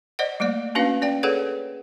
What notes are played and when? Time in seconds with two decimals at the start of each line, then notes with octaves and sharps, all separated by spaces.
0.19 C5 D5 D#5 F#5
0.40 G3 A3 A#3 D5
0.75 A#3 C#4 D4 F#4 B4 F5
1.02 C#4 D5 G5
1.23 G#4 A4 B4 C#5 F#5